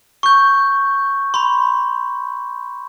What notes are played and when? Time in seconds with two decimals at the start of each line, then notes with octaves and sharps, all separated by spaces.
0.23 C#6 G6
1.34 B5 C6